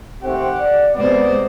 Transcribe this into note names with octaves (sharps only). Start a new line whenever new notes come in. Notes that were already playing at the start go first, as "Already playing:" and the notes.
D#3 A3 C4 G4 F#5
D5
C3 G#3 B3 C5 D5